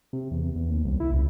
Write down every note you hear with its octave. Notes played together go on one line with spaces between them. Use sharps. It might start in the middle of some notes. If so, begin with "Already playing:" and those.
C3
E2
E2
D#2
C2
E4
C#2